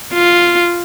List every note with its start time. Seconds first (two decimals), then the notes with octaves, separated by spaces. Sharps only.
0.13 F4